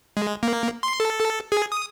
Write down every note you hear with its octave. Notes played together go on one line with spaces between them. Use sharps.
G#3
A#3
C6
A4
A4
G#4
D#6